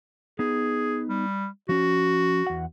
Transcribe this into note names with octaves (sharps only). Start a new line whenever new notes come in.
B3 D#4 G#4
G3
F3 C#4 F#4
E2 F#5